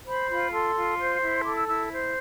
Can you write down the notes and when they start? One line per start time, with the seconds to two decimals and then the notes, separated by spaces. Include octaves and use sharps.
0.06 C5 B5
0.30 F4 B5
0.53 A4 C6
0.76 F4
0.99 C5
1.22 E4
1.44 A4 D6
1.56 E6
1.68 E4 E6
1.91 C5